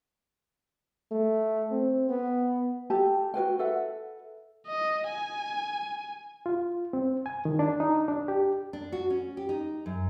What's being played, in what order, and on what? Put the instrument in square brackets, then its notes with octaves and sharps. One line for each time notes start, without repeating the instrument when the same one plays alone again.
[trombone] A3
C4
B3
[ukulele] G4 A4 G5 A5
F#4 A#4 B4 G5
A4 B4 E5 F#5
[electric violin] D#5
G#5
[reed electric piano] F4
C4
G#5
D#3
D4
D#4
D4
G4
[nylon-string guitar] D4
F#4
C#4
G4
D#4
F#2